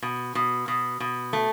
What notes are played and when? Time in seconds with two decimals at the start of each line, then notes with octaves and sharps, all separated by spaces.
0.02 B2
0.35 B2
0.68 B2
1.00 B2
1.33 A3